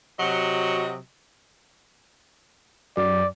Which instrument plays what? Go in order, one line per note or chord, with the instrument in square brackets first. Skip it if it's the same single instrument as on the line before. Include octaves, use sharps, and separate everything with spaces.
[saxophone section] C3 F#3 F#4 D#5
[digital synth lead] F#2 [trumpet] D5